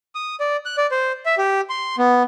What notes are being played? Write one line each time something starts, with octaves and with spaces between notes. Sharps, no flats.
D#6
D5
F#6
D5
C5
E5
G4
C6
B3